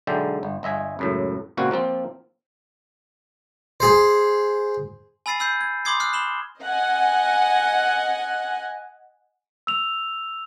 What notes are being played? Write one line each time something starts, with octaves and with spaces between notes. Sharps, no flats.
B1 D3 G#3 D5 E5 G5
G1
G1 D#5 E5 G#5
C#2 F#2 A2
C#2 A#2 C4 F#4 F5
F3 A#3 C4 F4
G#4 C5
G#5 B5 E6 A6 C7 D#7
B5 E6 G6 C7
G#6
B5 C6 D6 D#6 G#6 C7
D#6 F6 F#6 C7
B5 E7 F#7 G7
D#5 F#5 G#5
E6 F7